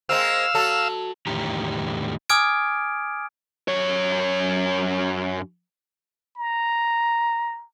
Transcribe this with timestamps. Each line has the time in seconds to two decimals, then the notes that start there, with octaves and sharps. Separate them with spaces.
0.09 G#3 A#3 C4 F5 E6
0.55 F#3 A4
1.27 E2 A2 D3 D#3 G4 A#5
2.29 G#5 D6 D#6 F6 G#6 D7
3.68 F#2 C#5
6.37 A#5